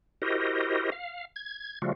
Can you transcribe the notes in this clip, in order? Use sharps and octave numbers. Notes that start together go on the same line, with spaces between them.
E4 F#4 G4 A#4 C5 D#5
F5
G#6
C#3 F3 G3 A3 F4 F#4